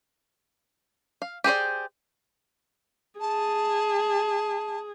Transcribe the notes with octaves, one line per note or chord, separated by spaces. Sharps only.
F5
G4 G#4 C5 D5
G#4 A5